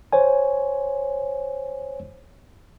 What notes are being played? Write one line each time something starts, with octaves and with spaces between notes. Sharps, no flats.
C5 C#5 G#5